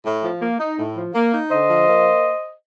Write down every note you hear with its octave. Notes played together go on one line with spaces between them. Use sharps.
A2
F3
A#3
D#4
A2
F3
A#3
D#4
D3 C5 D#5
F3
A#3